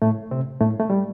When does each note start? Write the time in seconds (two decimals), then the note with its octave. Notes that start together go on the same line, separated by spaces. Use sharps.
0.02 A2 A3
0.31 C3 C4
0.60 A2 A3
0.80 A3
0.90 G3